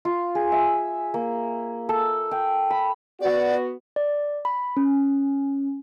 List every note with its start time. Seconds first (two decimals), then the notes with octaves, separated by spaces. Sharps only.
0.05 F4
0.35 G#4
0.52 E5
1.14 A#3
1.89 A4
2.31 G5
2.70 B5
3.21 B3 F#4 D5
3.96 D5
4.45 B5
4.77 C#4